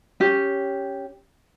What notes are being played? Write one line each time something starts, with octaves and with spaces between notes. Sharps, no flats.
C#4 G4